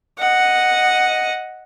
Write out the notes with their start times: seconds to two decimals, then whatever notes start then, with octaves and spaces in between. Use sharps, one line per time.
0.19 D#5 F#5